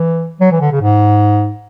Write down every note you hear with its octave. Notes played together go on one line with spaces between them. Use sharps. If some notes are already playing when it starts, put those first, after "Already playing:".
Already playing: E3
F#3
E3
D3
C#3
G#2